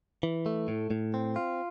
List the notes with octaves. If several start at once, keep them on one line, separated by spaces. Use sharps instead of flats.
E3
A3
A2
A2
C4
F4